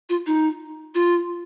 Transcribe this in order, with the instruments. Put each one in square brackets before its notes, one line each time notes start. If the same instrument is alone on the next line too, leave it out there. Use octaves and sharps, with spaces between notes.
[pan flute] F4
D#4
F4